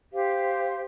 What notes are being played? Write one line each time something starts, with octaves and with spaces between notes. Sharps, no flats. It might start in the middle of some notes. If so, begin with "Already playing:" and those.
G4 C5 F5